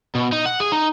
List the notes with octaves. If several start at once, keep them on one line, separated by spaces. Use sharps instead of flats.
B2
D#4
F#5
G#4
D#4